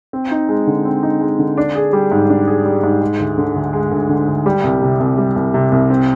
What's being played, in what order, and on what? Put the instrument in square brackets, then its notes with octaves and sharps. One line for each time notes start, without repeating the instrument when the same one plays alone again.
[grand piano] C4
D#4
G#3
D3
C4
D#4
G#3
D3
D4
G#4
G3
G#2
D4
G#4
G3
G#2
G#3
D2
D3
D2
G#3
D2
D3
D2
G3
C2
C3
C2
G3
C2
C3
C2
C4